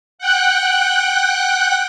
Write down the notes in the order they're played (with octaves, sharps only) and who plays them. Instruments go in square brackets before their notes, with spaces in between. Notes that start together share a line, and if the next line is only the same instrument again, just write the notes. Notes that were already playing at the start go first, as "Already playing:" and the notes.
[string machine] F#5 G5 F#6